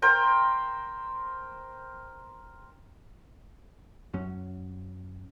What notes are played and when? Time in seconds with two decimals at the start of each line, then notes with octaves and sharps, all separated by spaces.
0.02 A#4 C5 G5 A#5
4.14 F#2 F#3 C#4